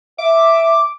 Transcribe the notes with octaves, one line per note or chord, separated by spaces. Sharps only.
E5 D6